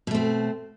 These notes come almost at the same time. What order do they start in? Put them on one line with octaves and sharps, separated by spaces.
B2 A3 C4